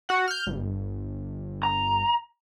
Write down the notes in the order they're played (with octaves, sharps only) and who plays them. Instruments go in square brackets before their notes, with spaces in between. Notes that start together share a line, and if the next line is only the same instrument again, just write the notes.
[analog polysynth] F#4 F#5
F6 G6
G1
[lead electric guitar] A#5